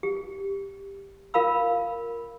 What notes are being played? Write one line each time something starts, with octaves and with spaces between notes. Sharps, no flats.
G4
F4 A#4 F5 B5 E6